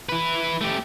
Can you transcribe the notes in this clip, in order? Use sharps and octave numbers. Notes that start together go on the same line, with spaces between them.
E4 B4
A3 G4